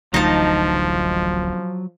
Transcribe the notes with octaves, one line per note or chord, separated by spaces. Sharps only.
D1 A1 D2 F3 F#3 D#4 F4 A5